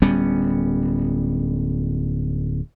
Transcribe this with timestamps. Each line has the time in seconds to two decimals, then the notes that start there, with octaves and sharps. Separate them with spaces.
0.02 D1 G3 B3 C#4